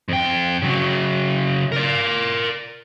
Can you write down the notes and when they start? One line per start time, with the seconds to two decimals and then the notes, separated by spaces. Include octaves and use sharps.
0.08 F2 G5
0.62 C#3 F#3
1.72 A#4 D5